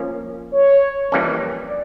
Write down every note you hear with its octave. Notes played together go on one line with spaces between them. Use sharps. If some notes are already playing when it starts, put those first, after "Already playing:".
Already playing: F3 A#3 C#4
C#5
F2 E3 G3 A#3 C#4
D5